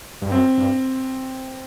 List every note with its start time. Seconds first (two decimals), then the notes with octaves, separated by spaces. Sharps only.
0.22 G2
0.32 F#2 C4
0.58 G2